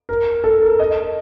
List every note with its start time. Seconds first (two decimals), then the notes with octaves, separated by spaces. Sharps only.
0.09 A#4
0.44 A4
0.62 A#4
0.79 D#5